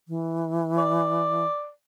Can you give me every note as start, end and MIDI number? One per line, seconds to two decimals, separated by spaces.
0.08 1.46 52
0.78 1.70 74